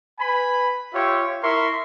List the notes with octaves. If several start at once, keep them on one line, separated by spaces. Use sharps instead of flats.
B4 G#5 B5
F4 G4 C#5 E5 C#6
E4 A#4 E5 C6 C#6